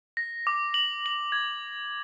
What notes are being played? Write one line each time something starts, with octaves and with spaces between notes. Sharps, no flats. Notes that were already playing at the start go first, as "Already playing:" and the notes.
A#6
D6
F#7
F#7
G#6